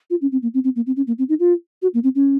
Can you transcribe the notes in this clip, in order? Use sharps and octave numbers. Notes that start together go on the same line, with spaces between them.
F4
C#4
C4
A#3
C4
C4
A#3
C4
C#4
A#3
C4
D#4
F4
F#4
A#3
C4
C#4